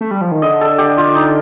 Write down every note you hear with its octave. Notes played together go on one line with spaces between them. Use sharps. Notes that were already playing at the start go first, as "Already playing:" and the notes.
A3
G3
F3
D#3
D3 D#5
A4
G4
F4
D#4